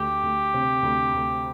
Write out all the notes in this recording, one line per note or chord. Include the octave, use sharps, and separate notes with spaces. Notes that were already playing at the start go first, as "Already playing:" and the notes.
Already playing: D2 G4
D2
C3
D2
D2